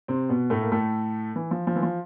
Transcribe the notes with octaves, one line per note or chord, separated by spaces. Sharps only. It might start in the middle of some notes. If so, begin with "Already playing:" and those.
C3 C4
B2 B3
A2 A3
A#3
A2 A3
E3
F3
F3
E3
F3